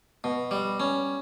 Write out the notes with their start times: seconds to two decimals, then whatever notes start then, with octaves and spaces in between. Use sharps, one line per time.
0.24 B2
0.51 G3
0.80 C#4